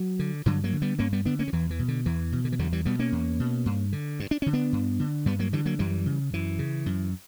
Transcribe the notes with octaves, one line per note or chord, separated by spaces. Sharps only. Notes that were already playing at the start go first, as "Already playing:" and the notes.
Already playing: F#3
D3
G2 D3 F#3
F#3 A#3
D3
G3 B3
G2 A#3 C#4
G3 B3
D3 B3 D4
A#3 C#4
D3
E2 E3
E3
B2
D3
E2 E3
B2
D3
E3
E2 D3 F#3
E3 G3
B2 G3 B3
A#3 C#4
E2
B2
G2
D3
G2
D4
D3 C#4
B3 D4
G2
D3
G2 G3 B3
F#3 A#3
D3 E3 G3
F#3 A#3
F#2 E3 G3
C#3
F#2 E3
C#3
F#2